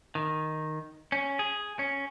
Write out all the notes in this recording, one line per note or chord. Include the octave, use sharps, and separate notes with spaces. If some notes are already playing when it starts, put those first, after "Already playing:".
D#3
C#4
G#4
C#4